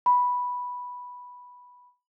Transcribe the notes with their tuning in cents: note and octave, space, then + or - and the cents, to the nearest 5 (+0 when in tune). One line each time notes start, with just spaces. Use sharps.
B5 -5